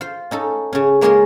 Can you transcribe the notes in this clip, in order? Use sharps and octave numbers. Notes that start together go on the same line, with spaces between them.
F4 C5
C#4 D#4 A4
C#3 C#4
G#3 A#3 C#4 F4 G#4 A#4